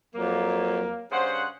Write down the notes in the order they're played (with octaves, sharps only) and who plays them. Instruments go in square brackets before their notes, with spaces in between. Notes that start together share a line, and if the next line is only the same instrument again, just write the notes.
[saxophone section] F2 F#3 [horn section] A#3
[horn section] G2 C#3 C5 [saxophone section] F#5